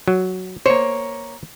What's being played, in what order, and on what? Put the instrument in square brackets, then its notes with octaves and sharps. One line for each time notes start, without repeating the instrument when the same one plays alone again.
[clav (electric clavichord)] F#3
[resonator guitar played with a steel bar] A#3 C#5 [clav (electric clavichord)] C5